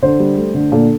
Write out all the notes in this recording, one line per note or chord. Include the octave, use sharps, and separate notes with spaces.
D3 C5
G3
A3
D3
A#2 A4